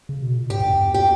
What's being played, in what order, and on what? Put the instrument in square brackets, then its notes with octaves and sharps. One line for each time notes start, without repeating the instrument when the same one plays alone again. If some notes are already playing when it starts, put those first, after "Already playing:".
[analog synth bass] C#3
B2
A#2
[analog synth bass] G#2 [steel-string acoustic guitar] G4
[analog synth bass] G2
E2
[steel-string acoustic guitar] G4